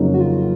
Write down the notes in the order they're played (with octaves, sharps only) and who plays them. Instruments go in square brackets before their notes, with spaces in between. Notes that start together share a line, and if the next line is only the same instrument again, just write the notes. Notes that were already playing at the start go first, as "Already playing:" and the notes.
Already playing: [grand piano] F2 C#3 F#3 A#3 D#4
[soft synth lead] F#4
F4